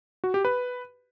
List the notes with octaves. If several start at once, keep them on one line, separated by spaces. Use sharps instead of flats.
F#4
G4
B4